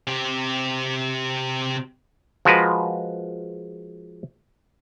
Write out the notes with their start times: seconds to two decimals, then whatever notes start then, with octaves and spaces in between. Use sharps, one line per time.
0.07 C3 G4
2.45 F3 G#3 F#4 A#4 B4